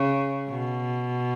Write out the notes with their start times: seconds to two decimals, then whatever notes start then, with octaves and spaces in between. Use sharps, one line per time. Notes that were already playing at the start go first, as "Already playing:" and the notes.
Already playing: C#3
0.50 B2